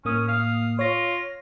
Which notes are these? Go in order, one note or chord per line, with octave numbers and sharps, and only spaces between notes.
A2 A#3 C#4 D#6
F5
F4 C#5 A#6